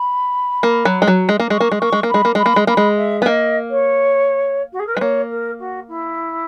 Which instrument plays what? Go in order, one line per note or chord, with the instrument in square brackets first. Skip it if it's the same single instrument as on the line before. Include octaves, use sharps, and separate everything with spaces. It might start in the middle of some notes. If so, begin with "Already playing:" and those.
Already playing: [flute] B5
[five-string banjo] A#3
F#3
G#3
F#3
G#3
A#3
[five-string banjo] G#3 [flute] C#6
[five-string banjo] A#3
G#3
[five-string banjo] A#3 [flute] C#6
[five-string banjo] G#3
A#3
[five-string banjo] G#3 [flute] B5
[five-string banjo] A#3
[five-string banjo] G#3 [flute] B5
[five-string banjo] A#3
G#3
[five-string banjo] A#3 [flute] B5
[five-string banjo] G#3
[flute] E5
[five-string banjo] B3
[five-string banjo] A#3 [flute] D#5
[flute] C#5
F#4
G#4
A#4
[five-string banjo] G#3 [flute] B4
[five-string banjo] A#3 [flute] C#5
[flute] A#4
F#4
E4